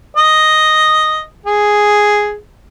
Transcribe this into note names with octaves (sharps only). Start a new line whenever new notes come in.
D#5
G#4